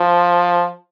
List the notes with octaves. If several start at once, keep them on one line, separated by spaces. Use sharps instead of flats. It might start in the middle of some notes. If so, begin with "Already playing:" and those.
Already playing: F3